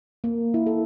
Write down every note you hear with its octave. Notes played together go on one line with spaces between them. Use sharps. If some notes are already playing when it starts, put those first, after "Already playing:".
A#3
E4
A4